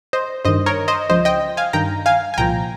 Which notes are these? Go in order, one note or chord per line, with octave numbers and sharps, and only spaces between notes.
C5 D#5
G2 D#3 C5 D#5
A#4 C#5
C5 D#5
C#2 C#3 F3 C5 D#5
D#5 G5
F5 G#5
G2 D#3 G5 A#5
F5 G#5
G#5
C2 A#2 F3 G5 A#5